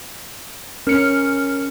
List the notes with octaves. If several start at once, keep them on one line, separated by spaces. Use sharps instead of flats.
C#4 A#4 F6 C#7